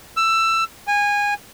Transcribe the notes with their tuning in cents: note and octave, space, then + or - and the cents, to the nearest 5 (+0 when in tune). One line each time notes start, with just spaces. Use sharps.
E6 +15
G#5 -20